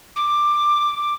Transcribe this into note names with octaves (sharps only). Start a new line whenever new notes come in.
D6